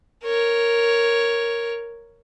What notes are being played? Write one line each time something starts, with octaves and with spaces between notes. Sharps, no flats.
A#4 C#5